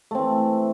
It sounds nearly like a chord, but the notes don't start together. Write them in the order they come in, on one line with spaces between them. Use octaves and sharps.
A3 C4 E3